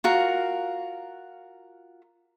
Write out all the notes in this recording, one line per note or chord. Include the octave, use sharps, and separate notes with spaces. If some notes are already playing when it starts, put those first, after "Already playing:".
F4 F#4 A#4